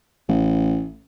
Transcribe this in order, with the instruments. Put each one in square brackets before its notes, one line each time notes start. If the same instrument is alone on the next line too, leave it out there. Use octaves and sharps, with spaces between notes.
[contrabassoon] A1